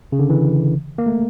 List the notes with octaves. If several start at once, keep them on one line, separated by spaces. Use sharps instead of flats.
C#3
D3
E3
A#3
A3